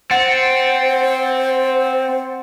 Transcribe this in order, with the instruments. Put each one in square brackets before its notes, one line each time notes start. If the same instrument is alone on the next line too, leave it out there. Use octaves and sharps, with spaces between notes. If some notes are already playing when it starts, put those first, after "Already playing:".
[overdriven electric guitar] C4 [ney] C5 [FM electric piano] F#5 A6 C#7